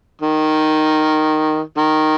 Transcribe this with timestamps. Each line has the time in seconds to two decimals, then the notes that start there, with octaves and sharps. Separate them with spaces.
0.22 D#3
1.77 D#3